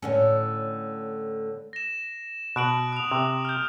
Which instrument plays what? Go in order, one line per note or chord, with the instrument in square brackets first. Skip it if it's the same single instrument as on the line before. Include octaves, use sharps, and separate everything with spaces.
[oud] A2 D3 C#4
[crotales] A#6 E7
[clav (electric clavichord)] B2 [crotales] F#6 D7 F#7
[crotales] D#6 F7
[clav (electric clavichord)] C3
[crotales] F6 G6